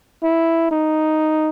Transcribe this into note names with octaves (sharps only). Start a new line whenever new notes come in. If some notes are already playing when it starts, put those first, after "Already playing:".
E4
D#4